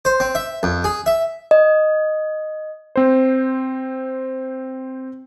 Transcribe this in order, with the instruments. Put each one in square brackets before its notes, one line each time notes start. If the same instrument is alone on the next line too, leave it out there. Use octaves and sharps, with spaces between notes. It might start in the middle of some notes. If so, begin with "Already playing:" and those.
[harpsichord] C5
C4
E5
F2
G#4
E5
[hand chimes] D#5
[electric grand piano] C4 C5